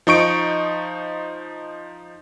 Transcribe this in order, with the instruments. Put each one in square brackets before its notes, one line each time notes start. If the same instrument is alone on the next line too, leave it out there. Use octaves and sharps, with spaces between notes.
[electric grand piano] F3 D#4 C#6 D7